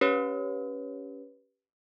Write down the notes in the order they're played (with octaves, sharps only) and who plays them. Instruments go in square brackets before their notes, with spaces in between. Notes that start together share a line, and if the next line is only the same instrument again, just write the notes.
[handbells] C#4 G4 B4 C#5